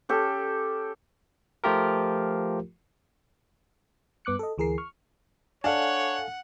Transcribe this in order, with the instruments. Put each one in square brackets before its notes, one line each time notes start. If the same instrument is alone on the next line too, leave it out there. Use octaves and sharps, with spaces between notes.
[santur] C#4 G4 A4
[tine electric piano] F3 A3 F4 G4 A#4
[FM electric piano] G2 B3 D6 F#6 C#7
A4 D#5
D2 E3 G#4 A#4 C7
C#6 F6
[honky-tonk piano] D4 [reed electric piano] A4 F5 G#5 [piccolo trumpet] C#5 [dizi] F#5